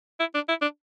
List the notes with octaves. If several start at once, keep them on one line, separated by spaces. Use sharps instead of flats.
E4
D4
E4
D4